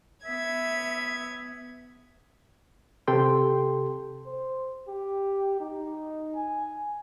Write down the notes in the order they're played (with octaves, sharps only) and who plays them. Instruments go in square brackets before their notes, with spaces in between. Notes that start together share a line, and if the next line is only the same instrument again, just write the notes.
[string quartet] B3 G#6 [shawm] E5
[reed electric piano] C3 G4 A4 G5 C6
[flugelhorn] C5
G4
D#4
G#5